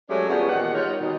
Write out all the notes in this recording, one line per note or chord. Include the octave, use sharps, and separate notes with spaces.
F#3 G#3 A3 C#4 G4 D5
C#3 F3 G3 B3
E2 A#2 D#3 G4 F#5
G3 D#4 F4 A#4 C#5
B2 D#3